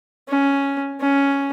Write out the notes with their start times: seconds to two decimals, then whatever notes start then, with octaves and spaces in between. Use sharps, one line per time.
0.29 C#4
1.01 C#4